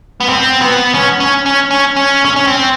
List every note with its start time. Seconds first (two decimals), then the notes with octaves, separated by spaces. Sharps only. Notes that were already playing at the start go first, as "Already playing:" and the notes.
0.20 B3
0.29 C4
0.62 B3
0.95 C#4
1.20 C#4
1.46 C#4
1.71 C#4
1.96 C#4
2.25 C#4
2.36 C#4
2.47 C4